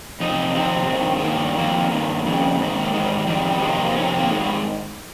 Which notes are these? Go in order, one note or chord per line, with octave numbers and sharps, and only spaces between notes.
F2 C3 D#4
F2 C3 D#3 C4
G2 D#3
G#3
G2 D#3 A#3
F2 D#3 A#3
G2 D#3
F2 C#3
G#2 D#3
A#3
G#2 D#3 G#3
G3
G3
F2 D#3 G3
G3
F2 C3 D#3 G#3
A#3
A#3
F2 C3 D#3 C#4
C4
A#3
G#2 D#3 G#3
G3